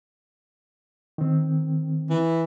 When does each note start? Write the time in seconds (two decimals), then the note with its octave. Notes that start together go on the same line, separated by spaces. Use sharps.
1.18 D#3 C4
2.10 E3